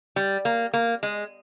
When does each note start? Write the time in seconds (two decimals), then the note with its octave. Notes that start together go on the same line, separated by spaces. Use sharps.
0.16 G3
0.45 A#3
0.74 A#3
1.03 G#3